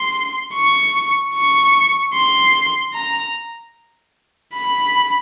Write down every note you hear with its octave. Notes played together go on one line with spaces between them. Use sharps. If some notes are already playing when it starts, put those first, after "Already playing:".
Already playing: C6
C#6
C#6
C6
A#5
B5